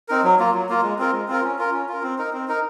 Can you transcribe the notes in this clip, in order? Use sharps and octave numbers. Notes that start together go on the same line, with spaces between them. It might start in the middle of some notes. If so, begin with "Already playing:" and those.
C4 D#4 A#4
F#3
A#3 F4
F#3
A#3 F4
G#3
C4 F4 A#4
G#3
C4 F4 A#4
C#4
F4 A#4
C#4
F4 A#4
C4
D#4 A#4
C4
D#4 A#4